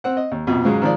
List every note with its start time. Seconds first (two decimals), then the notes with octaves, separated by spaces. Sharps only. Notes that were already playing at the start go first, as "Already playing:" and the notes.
0.04 C4 F#5
0.17 D#5
0.32 D#2
0.47 A#1 F2 B2
0.65 G#2 C#3 F#3 G#3
0.82 D#3 F3 G#3 D5